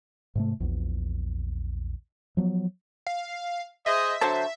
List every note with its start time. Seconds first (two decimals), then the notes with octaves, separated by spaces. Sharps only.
0.35 G#2 C3 A3
0.60 A#1 E2
2.37 F3 F#3 B3
3.07 F5
3.86 G#4 C5 D#5 E5
4.21 D3 F#3 F#4 C5 A5